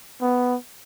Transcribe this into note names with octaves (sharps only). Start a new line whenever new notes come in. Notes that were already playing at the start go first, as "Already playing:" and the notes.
B3